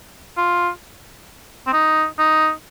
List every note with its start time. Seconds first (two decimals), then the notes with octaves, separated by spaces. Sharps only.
0.37 F4
1.67 C4
1.73 D#4
2.18 D#4